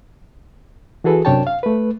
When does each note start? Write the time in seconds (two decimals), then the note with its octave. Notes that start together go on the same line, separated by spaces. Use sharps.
1.04 E3 F#4 G#4 A4 B4
1.25 F#2 C3 D4 C#5 G5 A5
1.47 F5
1.63 A3 B4